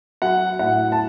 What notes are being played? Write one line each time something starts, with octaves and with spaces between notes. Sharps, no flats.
F#3 F#5
A2 F#5
A5